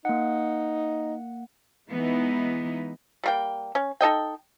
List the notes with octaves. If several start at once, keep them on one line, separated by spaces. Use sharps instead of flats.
A#3 D#4 F#5
E3 G#3 B3 D#4 E4
G3 A#3 G5
C#4
D#4 A4 D#5 G5